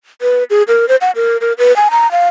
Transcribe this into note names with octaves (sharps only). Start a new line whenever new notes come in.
B4
G#4
A#4
C5
F#5
A#4
A#4
B4
G#5
A#5
F5